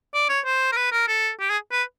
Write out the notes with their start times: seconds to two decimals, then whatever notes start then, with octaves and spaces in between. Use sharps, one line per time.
0.14 D5
0.29 C#5
0.46 C5
0.72 A#4
0.76 B4
0.92 A#4
1.08 A4
1.40 G4
1.50 G#4
1.72 B4